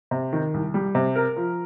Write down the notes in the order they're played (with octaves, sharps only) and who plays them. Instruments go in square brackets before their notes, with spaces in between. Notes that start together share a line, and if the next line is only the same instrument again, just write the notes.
[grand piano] C3
D#3
C2
G3
C3
A#4
F3